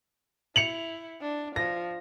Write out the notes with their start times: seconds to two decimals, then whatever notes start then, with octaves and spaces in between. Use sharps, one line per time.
0.56 E4 C#7 F7 F#7
1.21 D4
1.56 F3 A#6